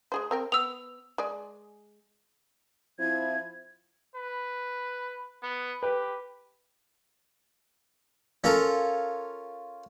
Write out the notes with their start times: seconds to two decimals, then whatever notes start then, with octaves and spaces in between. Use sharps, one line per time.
0.12 G#3 G#4 C5
0.31 C4 A#4 G5
0.52 B3 E6 F7
1.18 G#3 G#4 D5
2.99 F3 C4 E4 G#6
4.15 B4
5.42 B3
5.83 G4 B4
8.44 C#4 F4 A4 A#4